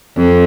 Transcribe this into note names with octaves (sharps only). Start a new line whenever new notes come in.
F2